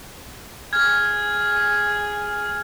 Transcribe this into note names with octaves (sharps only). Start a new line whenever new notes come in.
G#4 F6 G#6